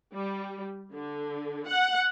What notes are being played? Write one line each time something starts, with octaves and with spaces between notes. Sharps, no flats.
G3
D3
F#5